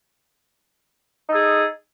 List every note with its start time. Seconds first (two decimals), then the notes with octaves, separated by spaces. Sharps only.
1.27 D#4
1.31 A4
1.35 G#4